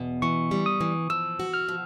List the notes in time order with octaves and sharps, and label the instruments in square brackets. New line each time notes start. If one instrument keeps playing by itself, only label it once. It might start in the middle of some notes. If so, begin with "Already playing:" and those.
Already playing: [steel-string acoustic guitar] E2 B2
[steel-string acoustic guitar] E3 [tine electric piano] C#6
[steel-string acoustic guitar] G3
[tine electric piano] D#6
[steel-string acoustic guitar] E3
[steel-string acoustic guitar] F3 [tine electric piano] E6
[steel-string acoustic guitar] F#4
[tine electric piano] F6
[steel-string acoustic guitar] F3